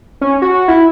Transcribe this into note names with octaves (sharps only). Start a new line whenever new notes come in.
C#4
F#4
E4